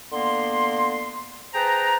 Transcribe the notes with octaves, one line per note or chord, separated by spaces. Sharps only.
D3 A#3 B3 C6
G#4 B4 C5 G5 A5 A#5